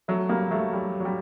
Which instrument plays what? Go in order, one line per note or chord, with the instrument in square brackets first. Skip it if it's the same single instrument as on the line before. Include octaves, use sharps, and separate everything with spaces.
[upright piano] F#3 A3
G3 A#3
F#3 A3
G3
F#3
G3